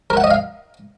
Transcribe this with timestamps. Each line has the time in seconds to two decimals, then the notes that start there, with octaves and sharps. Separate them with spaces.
0.10 A#4
0.17 F#5
0.24 D#5
0.31 F5